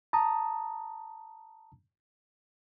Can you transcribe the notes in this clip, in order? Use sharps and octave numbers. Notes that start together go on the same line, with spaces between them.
A5 A#5 D#6